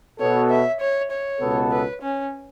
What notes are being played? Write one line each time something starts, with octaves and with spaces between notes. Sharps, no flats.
B2 B3 F#4 A4 C#5
E5
C#5
C#5
C#2 B2 B3 A4
B4
C#4